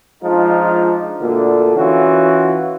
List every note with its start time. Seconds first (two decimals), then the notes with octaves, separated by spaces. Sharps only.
0.23 F3 G#3 D4 D#4 F4
1.21 D2 A#2 D3
1.76 E3 C#4 F4 F#4